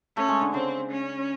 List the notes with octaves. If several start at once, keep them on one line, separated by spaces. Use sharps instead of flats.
A3 C#4
G#3
D3
C#3 C4
C#4